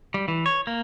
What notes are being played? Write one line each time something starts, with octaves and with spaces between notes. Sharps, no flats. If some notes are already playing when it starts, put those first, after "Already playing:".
G3
E3
C#5
A#3